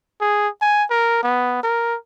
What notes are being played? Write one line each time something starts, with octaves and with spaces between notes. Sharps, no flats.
G#4
G#5
A#4
B3
A#4